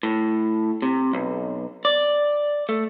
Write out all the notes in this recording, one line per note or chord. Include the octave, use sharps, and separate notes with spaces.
A2
C3
B1
D5
A3